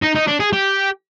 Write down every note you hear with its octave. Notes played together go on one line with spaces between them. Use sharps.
D#4
D#4
D4
G#4
G4